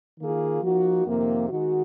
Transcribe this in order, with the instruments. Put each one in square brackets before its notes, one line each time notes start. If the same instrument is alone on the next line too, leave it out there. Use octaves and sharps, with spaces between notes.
[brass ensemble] D#3 A#3 F4 G#4
F3 A#3 D#4 F#4
F2 C3 D#3 A#3
D#3 G#3 D#4 F#4